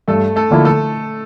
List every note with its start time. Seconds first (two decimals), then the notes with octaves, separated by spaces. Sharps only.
0.08 G2 A3 A4
0.36 A3 A4
0.51 D3 F3 A#3 E4
0.65 A3 A4